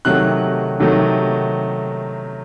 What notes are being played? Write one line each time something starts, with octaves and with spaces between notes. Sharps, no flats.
C3 D#3 F#3 A3 F#6
C3 D#3 F#3 A3